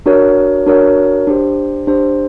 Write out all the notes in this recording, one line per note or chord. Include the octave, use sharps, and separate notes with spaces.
D4 F#4 A#4 C#5
D4 F#4 A#4 C#5
D4 G4 C5
D4 G4 C5